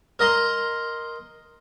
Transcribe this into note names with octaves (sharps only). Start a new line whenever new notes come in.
A#4 D#5 A#5 C6